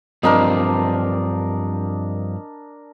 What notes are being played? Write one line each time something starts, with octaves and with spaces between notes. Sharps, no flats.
G2 F3 C4 D4 A#4 D#5